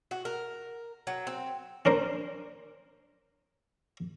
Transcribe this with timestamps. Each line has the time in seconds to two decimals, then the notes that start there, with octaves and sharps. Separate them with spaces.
0.11 F#4
0.25 A#4
1.07 F#3
1.27 C4
1.85 C#4 D4 A#4 C5